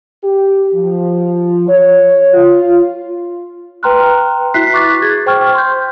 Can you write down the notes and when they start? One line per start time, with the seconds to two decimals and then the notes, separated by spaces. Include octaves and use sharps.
0.24 G4
0.75 F3
1.68 C#5
2.34 F4
3.83 B4 G5 A#5 C6 F6 F#6
4.54 E4 F#4 E5 F#6 B6 C7
4.74 C#6 D6 F#6 A6 B6
5.02 G#4 G#6 A6
5.26 C5 G5 C#6 F6
5.55 C6 G6